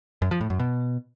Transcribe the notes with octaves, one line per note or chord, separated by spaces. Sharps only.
F#2
F3
A2
F#2
B2